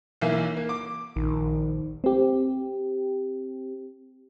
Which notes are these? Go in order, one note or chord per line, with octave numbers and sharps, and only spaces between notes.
B1 E3 A#3
A#3
D6
A#1 D#3
C4 G4